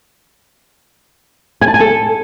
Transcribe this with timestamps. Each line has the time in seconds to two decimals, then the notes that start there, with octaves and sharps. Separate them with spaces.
1.61 G#5
1.68 A5
1.74 G#5
1.80 A4